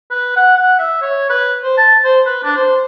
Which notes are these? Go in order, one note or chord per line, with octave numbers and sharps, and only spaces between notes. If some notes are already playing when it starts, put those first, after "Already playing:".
B4
F#5
F#5
E5
C#5
B4
C5
A5
C5
B4
D4
C5